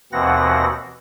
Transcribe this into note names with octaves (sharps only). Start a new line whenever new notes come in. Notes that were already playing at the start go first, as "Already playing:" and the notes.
D#2 B2 E3 C4 F#5 A#6